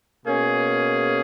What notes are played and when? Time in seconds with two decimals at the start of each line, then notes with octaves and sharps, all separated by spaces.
0.25 B2 A#3 C#4 G#4